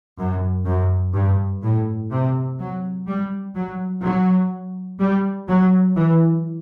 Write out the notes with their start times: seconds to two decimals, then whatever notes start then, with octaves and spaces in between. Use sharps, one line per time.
0.19 F#2
0.66 F#2
1.14 G2
1.63 A2
2.11 C3
2.59 F#3
3.07 G3
3.55 F#3
4.03 F#3
4.99 G3
5.48 F#3
5.96 E3